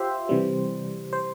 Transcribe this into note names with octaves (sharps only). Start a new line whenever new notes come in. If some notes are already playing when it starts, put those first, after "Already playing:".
Already playing: F4 G4 C5 E5
C3 E3 G3
C5